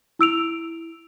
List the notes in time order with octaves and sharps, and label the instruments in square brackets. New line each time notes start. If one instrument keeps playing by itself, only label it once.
[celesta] E4 E6 D7 F7